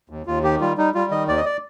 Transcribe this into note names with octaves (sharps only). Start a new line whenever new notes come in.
D#2
D#2 F4
D#3 G4
G3 F4
G3 D#4
G3 F4
D#3 D#5
D#2 D5
D#5
D5